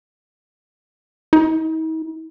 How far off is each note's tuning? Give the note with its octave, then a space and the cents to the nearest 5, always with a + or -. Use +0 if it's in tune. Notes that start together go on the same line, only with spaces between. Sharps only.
D#4 +45